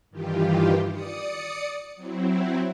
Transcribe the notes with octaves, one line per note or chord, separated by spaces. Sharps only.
G2 D#3 E3 F4 G4
D5 D#6 C#7
F#3 C4 E4